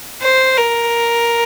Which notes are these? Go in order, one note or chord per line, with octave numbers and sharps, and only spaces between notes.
C5
A#4